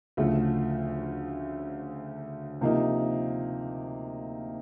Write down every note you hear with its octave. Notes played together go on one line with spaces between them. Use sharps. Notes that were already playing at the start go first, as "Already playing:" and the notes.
D2 C#3 F3 A3
C3 F3 A#3 D#4